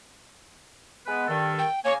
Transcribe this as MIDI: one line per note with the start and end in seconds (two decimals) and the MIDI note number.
1.07 1.25 56
1.07 1.25 59
1.07 1.25 71
1.28 1.63 43
1.28 1.63 51
1.28 1.63 69
1.58 1.80 79
1.85 1.95 49
1.85 1.95 58
1.85 1.93 73
1.85 1.95 80